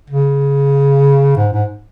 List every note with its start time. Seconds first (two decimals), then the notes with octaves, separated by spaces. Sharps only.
0.10 C#3
1.37 G#2
1.53 G#2